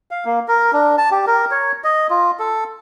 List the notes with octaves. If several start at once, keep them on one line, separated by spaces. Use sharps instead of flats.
F5
A#3
A#4
D4
A5
G4
A#4
C#5
D#5
F4
A4